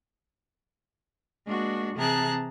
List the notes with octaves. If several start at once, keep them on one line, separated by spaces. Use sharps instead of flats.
G#3 A#3 D4 F#4
C3 E3 G#4 A5 A#5 F#6